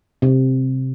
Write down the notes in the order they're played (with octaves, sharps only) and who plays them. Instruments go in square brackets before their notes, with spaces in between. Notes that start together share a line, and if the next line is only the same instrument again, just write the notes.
[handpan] C3